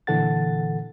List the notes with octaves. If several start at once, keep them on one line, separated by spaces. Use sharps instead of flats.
A#2 D3 E3 A4 F#5 A6